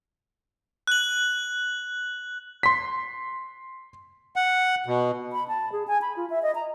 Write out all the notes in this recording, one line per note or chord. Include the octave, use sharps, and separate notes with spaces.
F#6 F#7
C6 B6
F#5
B2
B5
A5
G#4
G#5
B5
F4
E5
D#5
A#5